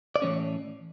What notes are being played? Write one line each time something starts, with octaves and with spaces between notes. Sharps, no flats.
D5
A2 E3 G#3 C#4 C#5